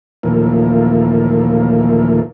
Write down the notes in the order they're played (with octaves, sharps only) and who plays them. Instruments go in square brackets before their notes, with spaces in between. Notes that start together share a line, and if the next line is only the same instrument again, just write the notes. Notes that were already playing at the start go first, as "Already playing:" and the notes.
[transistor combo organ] D#2 A#2 E3 F3 A3 A#3